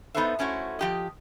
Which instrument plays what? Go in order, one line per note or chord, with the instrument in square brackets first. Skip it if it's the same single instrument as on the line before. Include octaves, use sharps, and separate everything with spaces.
[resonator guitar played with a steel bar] B3 D#4 A4 B4 C5 E5
A3 C#4 E4 F#4 C5
F3 G4 D#5